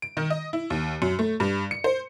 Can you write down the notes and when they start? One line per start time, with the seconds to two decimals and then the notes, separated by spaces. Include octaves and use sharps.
0.02 D7
0.17 D#3
0.30 D#5
0.53 E4
0.70 D#2
1.02 F#2
1.19 A3
1.40 G2
1.71 C#7
1.84 C5